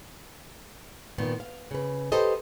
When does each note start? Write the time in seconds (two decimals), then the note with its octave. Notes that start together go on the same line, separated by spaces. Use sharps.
1.18 A#2 D#3 B3
1.40 F5
1.71 C#3 B4
2.12 G4 A4 B4 C5 D#5